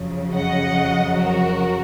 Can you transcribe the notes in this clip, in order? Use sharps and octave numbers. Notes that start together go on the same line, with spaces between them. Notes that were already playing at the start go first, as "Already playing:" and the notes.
Already playing: F2 C#3 F#3
D#5 F#5
F#4 A#4